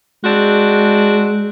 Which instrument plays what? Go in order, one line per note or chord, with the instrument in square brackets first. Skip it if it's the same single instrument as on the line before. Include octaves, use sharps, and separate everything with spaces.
[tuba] G#3 [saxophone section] C4 D4 F#4